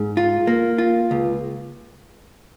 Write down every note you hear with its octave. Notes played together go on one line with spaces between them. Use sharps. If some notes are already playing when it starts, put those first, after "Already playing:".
Already playing: G#2
F4
A#3
F4
C#2